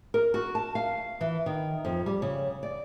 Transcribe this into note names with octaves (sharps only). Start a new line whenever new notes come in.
A#4
F#4
A5
F5
E3
D#3
F2
G3
C#3
D5